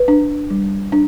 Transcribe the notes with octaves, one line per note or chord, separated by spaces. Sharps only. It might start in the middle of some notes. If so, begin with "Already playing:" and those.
Already playing: B4
D4
G3
D4